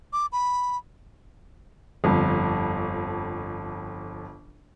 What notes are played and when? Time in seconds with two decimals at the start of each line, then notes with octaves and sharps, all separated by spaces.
0.13 D6
0.32 B5
2.04 G1 F2